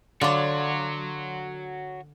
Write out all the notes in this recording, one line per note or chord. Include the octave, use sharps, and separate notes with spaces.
D3 F4 F#4 C#5 D5